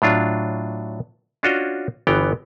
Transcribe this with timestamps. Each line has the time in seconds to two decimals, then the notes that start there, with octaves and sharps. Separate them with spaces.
0.02 A2 F#3 D4 F4
1.43 C#4 D4 F4 F#4 C#5 D#5
2.07 G1 E3 B3 G5 A#5